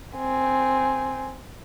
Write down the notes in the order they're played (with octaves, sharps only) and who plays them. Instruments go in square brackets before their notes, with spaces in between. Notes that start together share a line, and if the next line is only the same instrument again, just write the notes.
[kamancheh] C4 G#5